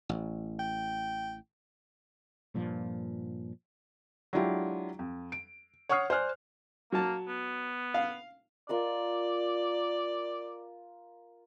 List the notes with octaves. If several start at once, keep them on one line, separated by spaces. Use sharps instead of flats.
A1
G5
G2 A#2 F3
F#3 G#3 D4 E4 F4 G4
F2
D7
C#5 F#5 C#6 D#6 F6 C7
C5 D5 G#5 F6 F#6
F#3 A#3 A5
B3
F5
F4 A#4 D5 D#5